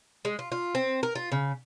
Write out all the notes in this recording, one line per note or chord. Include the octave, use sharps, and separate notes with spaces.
G#3
F4
F4
C4
A#4
F4
C#3